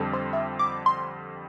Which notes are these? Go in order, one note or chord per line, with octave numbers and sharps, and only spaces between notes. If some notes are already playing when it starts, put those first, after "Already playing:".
Already playing: F2 D3 G3 C4 A4
C5
E5
D6
C6